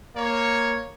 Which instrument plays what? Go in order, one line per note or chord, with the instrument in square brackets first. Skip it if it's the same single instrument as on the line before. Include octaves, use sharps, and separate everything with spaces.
[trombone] A#3 [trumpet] C#5